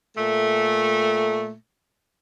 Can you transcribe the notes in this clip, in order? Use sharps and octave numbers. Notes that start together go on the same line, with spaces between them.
A#2 A3